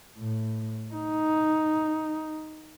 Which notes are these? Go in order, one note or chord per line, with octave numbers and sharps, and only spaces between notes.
A2
D#4